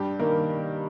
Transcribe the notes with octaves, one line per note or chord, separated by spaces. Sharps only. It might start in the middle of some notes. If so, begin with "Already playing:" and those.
Already playing: G2 G3 G4
D#3 A#3 A#4